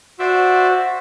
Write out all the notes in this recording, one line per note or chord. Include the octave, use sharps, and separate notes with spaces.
F#4 C5 D5 E5